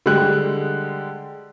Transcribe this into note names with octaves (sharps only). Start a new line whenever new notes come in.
D3 G3 G#3 G5 F#6